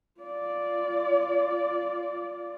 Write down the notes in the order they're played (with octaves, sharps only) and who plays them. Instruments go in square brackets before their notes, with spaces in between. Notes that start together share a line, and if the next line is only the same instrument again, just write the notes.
[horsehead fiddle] F4 D5